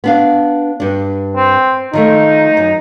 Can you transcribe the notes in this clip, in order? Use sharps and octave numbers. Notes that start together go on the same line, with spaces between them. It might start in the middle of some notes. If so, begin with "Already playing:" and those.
B3 D4 F5
G2 D4
C4
D#3 F3 A3 D#4
F#2